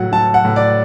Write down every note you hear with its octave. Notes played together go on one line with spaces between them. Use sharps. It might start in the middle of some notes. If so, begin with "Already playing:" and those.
Already playing: A2 F#3 F#5
F#3 A5
F#5
A2
D5